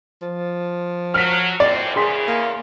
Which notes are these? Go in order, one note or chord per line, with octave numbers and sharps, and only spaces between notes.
F3
F#3 F6 B6
F#2 A2 C4 D5
E2 C#3 G#4 C6 B6
A#3